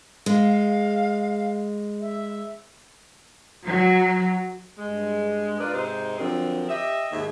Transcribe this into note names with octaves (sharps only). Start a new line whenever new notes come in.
G#3 F5
E5
F#3
G2 G#3
D4 F4 A#4 B4 D5
G#2 C3 D#4 C5
D3 F3 F#3 C4 A#4
G4 D#5 E5
D#2 G#2 G#4 E5